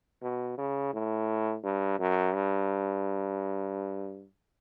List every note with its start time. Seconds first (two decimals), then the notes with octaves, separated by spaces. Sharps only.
0.22 B2
0.58 C#3
0.93 A2
1.63 G2
1.99 F#2
2.34 G2